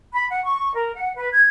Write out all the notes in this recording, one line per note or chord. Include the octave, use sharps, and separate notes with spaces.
B5
F#5
C#6
A#4
F#5
B4
G#6